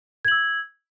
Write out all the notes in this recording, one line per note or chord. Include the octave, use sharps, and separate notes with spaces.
E6 G#6 F#7